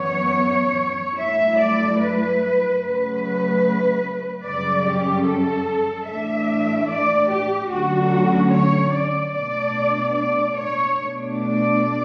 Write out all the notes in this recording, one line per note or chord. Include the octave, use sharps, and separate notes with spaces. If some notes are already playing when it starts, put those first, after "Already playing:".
Already playing: F#2 E3 B3 C#5
G2 F#3 A3 E4 E5
D5
B4
C#3 F#3 A3 B4
F#2 C#3 G3 C#4 D5
G4
A4
A2 E3 A3 D4 E5
D5
G4
D2 D3 F#3 A3 C#4 F#4
C#5
D5
B2 A3 D4 D5
D5
C#5
B2 A3 D4
D5